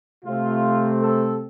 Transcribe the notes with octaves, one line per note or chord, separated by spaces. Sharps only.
C3 A3 C4 F4
A4